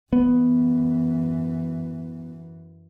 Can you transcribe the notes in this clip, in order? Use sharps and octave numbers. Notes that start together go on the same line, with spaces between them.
F#2 E3 B3